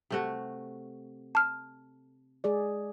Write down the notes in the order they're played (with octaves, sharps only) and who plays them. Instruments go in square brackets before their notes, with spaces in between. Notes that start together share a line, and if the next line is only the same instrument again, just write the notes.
[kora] C3 A3 F#4
[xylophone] A5 F6
[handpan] G#3 G#4 D5